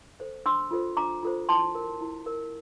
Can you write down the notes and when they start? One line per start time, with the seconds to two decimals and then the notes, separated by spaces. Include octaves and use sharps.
0.20 A4 C5
0.46 D4 C6 E6
0.71 F4 A4 C5
0.97 D4 A#5 D6
1.23 F4 A4 C5
1.49 E4 A5 C6
1.75 A#4
2.01 E4
2.26 A#4